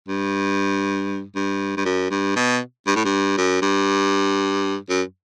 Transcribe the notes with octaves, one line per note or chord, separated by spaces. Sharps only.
G2
G2
G2
F#2
G2
B2
G2
A2
G2
F#2
G2
F#2